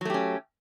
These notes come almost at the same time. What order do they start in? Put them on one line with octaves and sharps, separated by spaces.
F#3 A3 G4 C#4